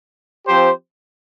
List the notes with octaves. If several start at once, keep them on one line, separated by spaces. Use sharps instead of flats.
F3 C4 G4 C5